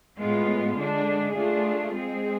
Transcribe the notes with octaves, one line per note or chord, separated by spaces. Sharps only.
A2 G#3 B3 F4
D3 G#3 D4
A3 D4 F4 G#4
G#3 C4 G#4